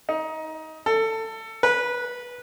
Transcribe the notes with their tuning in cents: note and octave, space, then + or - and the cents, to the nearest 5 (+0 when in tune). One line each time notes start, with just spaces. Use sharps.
D#4 +20
A4 +20
B4 -15